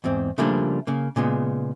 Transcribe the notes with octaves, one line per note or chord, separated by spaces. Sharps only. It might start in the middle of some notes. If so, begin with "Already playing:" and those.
E2 G#2 C4
C#3 F3 G3 A3 A#3 D4
C#3 A#3
A#2 C#3 G#3 B3